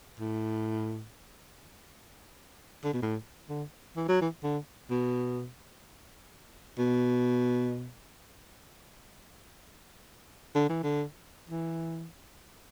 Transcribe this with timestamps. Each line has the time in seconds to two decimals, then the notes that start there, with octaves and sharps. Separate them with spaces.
0.20 A2
2.84 D3
2.93 B2
3.02 A2
3.49 D3
3.96 E3
4.08 F#3
4.21 E3
4.43 D3
4.90 B2
6.79 B2
10.55 D3
10.69 E3
10.83 D3
11.50 E3